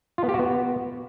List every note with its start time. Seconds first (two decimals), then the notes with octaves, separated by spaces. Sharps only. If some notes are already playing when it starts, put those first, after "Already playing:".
0.18 F4
0.23 B3
0.29 G4
0.34 F#4
0.39 B3